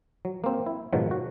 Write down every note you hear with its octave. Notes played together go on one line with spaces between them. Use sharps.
F#3
A#3 C4
E4
G#2 B2 D#3 F3 F#3
F#4